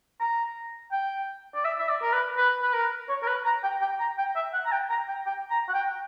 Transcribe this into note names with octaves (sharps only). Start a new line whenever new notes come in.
A#5
G5
D5
E5
E5
D5
A#4
B4
B4
B4
A#4
C#5
A#4
B4
A#5
G5
G5
A#5
G5
E5
F#5
A#5
G5
A#5
G5
G5
A#5
F#5
G5